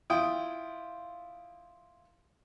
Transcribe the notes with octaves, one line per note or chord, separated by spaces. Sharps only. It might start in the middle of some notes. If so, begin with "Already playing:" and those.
E4 F4 G5 D#6